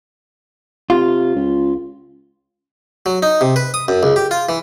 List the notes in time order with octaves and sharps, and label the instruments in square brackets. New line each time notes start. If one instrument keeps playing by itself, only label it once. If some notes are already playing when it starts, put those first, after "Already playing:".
[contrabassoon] C3 [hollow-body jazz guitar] F4
[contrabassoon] C#2
[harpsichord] F#3
D#4
C3
B4
D#6
F#2
C#2
G4
F4
E3